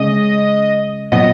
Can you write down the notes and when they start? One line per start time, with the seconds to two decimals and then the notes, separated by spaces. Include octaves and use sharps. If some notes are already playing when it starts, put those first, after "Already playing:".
Already playing: C#3 G#3 C#4 D#5
1.12 A#2 F#3 B3 D#5